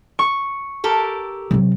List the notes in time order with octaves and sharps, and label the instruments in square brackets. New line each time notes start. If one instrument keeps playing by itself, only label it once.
[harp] C#6
[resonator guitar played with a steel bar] G4 A4 A#4
[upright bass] C3 F#3